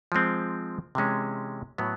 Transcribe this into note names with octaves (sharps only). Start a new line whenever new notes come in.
F3 G#3 C4
C3 E3 G#3 C#4
A2 F#3 B3